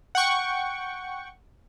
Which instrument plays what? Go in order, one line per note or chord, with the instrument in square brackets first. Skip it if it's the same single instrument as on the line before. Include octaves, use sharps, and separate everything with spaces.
[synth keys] F#5 G5 C#6